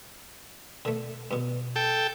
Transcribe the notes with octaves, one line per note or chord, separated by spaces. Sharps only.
D3 A3
G2 B2
A4 G5